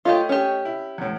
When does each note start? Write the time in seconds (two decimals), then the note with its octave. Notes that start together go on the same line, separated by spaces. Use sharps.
0.05 A3 F4 G4 C#5 D#5
0.29 C#4 G4
0.65 E4
0.98 E2 A2